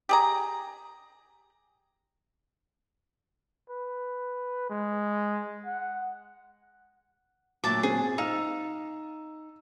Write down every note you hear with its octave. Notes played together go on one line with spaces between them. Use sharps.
G4 G#4 A#5
B4
G#3
F#5
D2 A#2 F#3 E5 A5 D6
C4 G#4
D#4 F5 E6